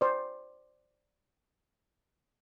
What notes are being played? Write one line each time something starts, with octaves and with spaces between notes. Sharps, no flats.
C5 D5